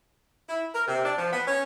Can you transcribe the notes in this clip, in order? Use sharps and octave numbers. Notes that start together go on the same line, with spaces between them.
E4
A#4
C3
D4
F3
B3
C#4